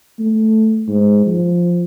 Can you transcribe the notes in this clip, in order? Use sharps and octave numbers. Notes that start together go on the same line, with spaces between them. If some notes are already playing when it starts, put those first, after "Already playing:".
A3
G#2
F3